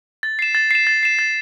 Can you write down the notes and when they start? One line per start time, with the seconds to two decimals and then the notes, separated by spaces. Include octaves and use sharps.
0.23 A6
0.39 C7 E7
0.55 A6
0.71 C7 E7
0.87 A6
1.03 C7 E7
1.19 A6